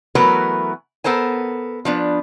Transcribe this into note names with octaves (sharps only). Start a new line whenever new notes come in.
E3 F#3 A3 B3 A#4 B4
B3 A4 A#4 C5 G#5
F3 B3 D4